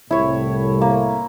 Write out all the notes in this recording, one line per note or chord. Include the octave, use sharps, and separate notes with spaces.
C2 A2 E4 C#5
A#3